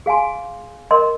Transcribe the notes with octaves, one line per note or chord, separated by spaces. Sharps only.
G#4 F5 G#5 C6
A#4 D#5 C6